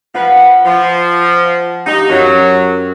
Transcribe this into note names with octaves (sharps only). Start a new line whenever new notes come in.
F3 B4 F#5
F3
D#4 G4
F#2 F#3